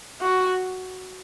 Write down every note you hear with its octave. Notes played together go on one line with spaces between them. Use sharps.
F#4